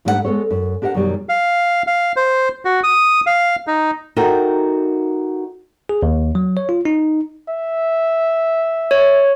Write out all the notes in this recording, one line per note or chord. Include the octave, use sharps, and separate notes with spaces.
G#2 G3 A3 D4 B4 F#5
G#3 B3 A4 C#5
F#2
D4 G4 A#4 D#5 F#5
F#2 B2 D#3 F#3 G3
F5
F5
C5
F#4
D#6
F5
D#4
D#4 F#4 A4 A#4 E5 G5
G#4
D#2
F#3
C#5
F4
D#4
E5
C#5